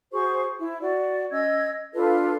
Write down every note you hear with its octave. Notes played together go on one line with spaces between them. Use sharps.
F#4 G#4 C5 C#6
E4
F#4 D5
C#4 D#5 E6 G#6
D4 F4 A4 B4